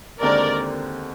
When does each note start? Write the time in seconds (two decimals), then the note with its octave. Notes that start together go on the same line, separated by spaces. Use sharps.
0.21 D#2 D3 G#3 C4 A#4 D5